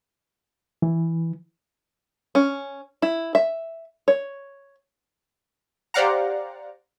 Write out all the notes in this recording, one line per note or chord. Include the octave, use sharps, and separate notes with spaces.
E3
C#4
E4
E5
C#5
G4 C5 D5 F5 F#5 A#5